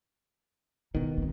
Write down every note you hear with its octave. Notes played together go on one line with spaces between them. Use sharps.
B2 D#3 D#4
C4 D4